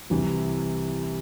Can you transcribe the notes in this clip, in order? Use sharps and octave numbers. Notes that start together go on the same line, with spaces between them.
C2 C3 E3